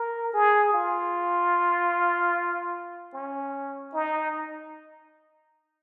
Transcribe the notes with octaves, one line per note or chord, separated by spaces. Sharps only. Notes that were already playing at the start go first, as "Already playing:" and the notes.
Already playing: A#4
G#4
F4
C#4
D#4